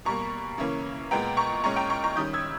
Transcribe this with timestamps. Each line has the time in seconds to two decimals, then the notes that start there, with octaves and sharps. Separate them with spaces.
0.05 B2 G3 A#3 A#5 C#6
0.58 C#3 E3 A#3 C#4
1.11 A#2 G#3 B3 G5 A#5
1.37 A#5 C#6
1.64 A#2 G#3 C#4 A#5 C#6
1.76 G5 A#5
1.90 A#5 C#6
2.04 A#5 C#6
2.16 D#3 G3 C#4 D#6 G6
2.33 E6 G#6